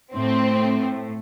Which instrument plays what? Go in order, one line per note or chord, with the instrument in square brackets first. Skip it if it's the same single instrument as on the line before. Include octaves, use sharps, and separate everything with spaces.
[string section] A2 [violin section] C4